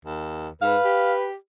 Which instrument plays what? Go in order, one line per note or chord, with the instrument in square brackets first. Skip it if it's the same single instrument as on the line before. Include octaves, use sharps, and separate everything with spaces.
[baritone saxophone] D#2
[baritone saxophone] G#2 [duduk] B4 [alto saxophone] F5
[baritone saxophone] G4